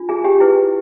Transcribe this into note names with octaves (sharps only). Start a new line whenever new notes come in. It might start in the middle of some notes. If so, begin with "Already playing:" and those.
Already playing: D4 F4
G#4 G#5
G4 G5
E4 G#4 B4